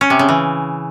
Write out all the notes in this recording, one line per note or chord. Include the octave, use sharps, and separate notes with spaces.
C#4
C3
C#3
E3